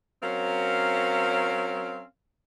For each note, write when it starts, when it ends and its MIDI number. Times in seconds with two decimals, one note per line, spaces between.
0.22 2.02 54
0.22 2.02 60
0.22 2.02 61
0.22 2.02 70
0.22 2.02 77